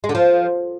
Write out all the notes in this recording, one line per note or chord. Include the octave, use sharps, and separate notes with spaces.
G#3
D3
F3